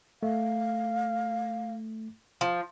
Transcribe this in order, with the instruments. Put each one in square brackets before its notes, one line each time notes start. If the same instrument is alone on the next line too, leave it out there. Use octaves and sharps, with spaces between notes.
[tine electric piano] A3 [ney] F5
[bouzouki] F3